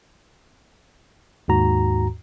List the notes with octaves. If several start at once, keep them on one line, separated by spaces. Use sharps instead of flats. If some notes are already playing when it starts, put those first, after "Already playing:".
D#2 G#2 F#4 A#5